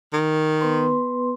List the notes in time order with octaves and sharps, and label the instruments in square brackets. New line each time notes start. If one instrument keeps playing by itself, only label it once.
[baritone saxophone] D#3
[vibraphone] B3 B4 C6